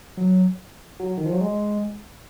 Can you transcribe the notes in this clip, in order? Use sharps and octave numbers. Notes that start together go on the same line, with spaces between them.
F#3
F#3
D#3
F3
F#3
G#3